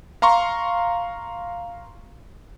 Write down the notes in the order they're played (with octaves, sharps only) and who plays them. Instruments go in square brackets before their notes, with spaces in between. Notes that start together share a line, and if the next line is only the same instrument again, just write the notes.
[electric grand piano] F5 A#5 C6 C#6